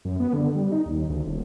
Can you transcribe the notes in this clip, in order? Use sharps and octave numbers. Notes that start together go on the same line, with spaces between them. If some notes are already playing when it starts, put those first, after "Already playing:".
F#2
B3
D3
G3
D#4
D#2
D2
D#1